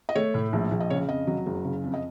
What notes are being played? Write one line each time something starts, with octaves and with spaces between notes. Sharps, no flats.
D#5
A3 C#5
A2
A#1
A#1
D#5
C#3 C#5
F2 D#5
F#3
F#1
C#3
F2
D#5